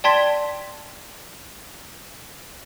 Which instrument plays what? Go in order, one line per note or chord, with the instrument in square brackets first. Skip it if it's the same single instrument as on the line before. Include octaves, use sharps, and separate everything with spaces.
[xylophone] D5 G5 A5 C6 G#6 B6